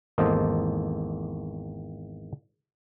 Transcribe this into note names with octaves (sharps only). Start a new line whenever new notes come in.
G#1 E2 A#3 A4 C5 D#5